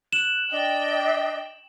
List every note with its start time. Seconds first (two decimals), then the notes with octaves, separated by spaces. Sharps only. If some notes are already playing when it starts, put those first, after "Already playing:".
0.13 F#6 E7 F#7
0.50 D4 D#5 G5